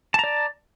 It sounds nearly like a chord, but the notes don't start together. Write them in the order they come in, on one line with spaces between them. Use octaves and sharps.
A5 A#5 D5